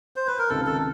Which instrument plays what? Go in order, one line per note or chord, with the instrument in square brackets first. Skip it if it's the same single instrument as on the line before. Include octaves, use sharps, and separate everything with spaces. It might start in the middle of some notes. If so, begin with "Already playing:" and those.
[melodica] C5
B4
A#4
[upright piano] C#2 C3 D#3 [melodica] A4
[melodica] A4